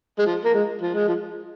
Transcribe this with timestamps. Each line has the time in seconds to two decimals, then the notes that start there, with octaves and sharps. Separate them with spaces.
0.19 G#3
0.26 F3
0.45 A#3
0.54 G#3
0.81 F3
0.95 G#3
1.08 F3